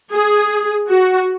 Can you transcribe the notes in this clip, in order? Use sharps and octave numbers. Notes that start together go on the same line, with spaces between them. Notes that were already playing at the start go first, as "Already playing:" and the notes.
G#4
F#4